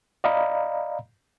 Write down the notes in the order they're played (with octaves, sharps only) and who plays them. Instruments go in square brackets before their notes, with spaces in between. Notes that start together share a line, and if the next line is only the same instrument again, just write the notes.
[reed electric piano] D5 D#5 F5 A#5 B5